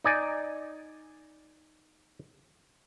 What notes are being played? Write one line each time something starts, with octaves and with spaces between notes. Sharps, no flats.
D#4 D5 G#5